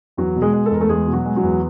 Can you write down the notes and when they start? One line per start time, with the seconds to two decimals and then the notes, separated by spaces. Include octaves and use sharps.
0.17 E2 F#3 F#4
0.36 B2
0.42 G#3 G#4
0.53 G#3
0.66 A4
0.71 E2 A#4
0.81 A3 A4
0.89 E2 G#3 G#4
1.07 B2
1.13 F#3 F#4
1.25 G#3
1.36 F#3 F#4
1.43 E2